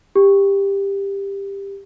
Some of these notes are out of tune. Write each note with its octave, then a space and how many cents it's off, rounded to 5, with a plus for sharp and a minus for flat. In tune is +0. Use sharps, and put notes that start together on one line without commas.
G4 +15